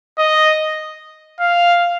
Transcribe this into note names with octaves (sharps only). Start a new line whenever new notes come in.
D#5
F5